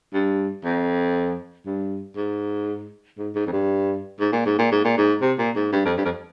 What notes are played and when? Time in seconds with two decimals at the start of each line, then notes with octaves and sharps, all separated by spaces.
0.13 G2
0.64 F2
1.66 G2
2.17 G#2
3.18 G#2
3.35 G#2
3.47 F2
3.52 G2
4.20 G#2
4.33 A#2
4.46 G#2
4.59 A#2
4.72 G#2
4.85 A#2
4.97 G#2
5.21 C3
5.38 A#2
5.55 G#2
5.72 G2
5.85 F2
5.98 G2
6.05 F2